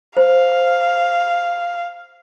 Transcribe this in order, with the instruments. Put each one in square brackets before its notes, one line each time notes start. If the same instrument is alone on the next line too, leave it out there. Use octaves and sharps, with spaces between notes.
[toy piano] C5 [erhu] F5